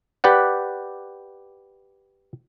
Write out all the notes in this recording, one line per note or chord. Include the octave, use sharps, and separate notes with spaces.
G4 B4 D5 F#5